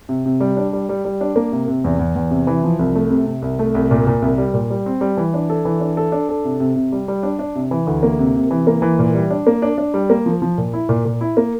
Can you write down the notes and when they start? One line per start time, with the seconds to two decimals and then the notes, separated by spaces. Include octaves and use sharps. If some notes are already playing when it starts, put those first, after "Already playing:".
0.09 C3
0.26 C3
0.40 G3
0.57 D4
0.73 G3
0.89 G3
1.05 G3
1.21 D4
1.36 A#3
1.52 C3
1.68 C3
1.84 E2
1.99 E2
2.16 E2
2.31 C3
2.47 E3
2.64 F3
2.79 C2
2.95 A3
3.10 C3
3.26 C3
3.42 C2
3.59 A3
3.75 C2
3.91 A#2
4.07 A#2
4.22 C2
4.38 G3
4.54 A#2
4.70 G3
4.86 C4
5.01 G3
5.17 E3
5.34 D4
5.50 A4
5.65 E3
5.80 D4
5.97 A4
6.12 D4
6.29 A4
6.45 C3
6.60 C3
6.76 C3
6.92 G3
7.08 G3
7.23 D4
7.39 D4
7.55 C3
7.71 E3
7.87 D2
8.03 A#3
8.19 C3
8.35 C3
8.51 E3
8.67 A#3
8.82 E3
8.99 A#2
9.15 G3
9.30 D4
9.47 A#3
9.62 D4
9.78 D4
9.94 G3
10.10 A#3
10.26 F3
10.42 F3
10.58 A#2
10.73 E4
10.89 A#2
11.05 A#2
11.21 E4
11.37 A#3